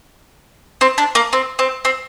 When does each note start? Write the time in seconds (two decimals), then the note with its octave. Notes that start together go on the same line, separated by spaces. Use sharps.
0.81 C4
0.98 D4
1.15 A#3
1.33 C4
1.59 C4
1.85 C4